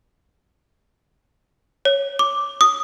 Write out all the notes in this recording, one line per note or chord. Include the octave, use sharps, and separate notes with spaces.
C#5
D6
D#6